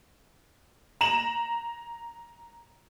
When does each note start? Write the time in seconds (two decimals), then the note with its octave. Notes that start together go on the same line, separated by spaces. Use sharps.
1.01 A#5 E7 F#7